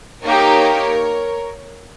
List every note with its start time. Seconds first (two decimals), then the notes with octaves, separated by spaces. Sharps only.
0.24 A#3 D#4 G4 A#4 C#5